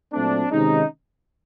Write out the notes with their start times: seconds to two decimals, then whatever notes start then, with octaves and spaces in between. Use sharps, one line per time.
0.13 A#2 F#3 A3 C4 D4
0.51 C3 D#3 G#3 C#4 D#4